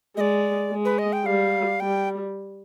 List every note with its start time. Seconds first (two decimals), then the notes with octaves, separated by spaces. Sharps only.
0.17 G#3 D#5
0.21 D5
0.71 G#3
0.85 B4
0.98 D#5
1.13 G5
1.25 G3 F5
1.80 G3 G5